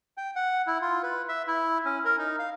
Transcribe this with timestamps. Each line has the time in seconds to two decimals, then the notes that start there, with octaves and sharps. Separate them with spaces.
0.17 G5
0.36 F#5
0.67 E4
0.81 F4
1.03 B4
1.29 E5
1.47 E4
1.85 C#4
2.05 A#4
2.18 D#4
2.39 F5